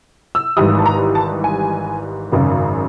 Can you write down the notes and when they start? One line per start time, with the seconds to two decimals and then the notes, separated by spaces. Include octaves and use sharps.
0.35 E6
0.57 G#1 G#2 E3 G3 D#6
0.79 A5
0.86 A#5
1.15 A5
1.44 G#5
2.32 G#1 F#2 C#3